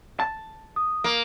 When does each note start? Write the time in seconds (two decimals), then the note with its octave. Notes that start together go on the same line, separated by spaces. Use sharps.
0.20 A5
0.76 D#6
1.04 A#3